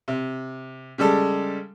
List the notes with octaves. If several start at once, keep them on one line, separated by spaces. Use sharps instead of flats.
C3
C#3 G3 G#3 A4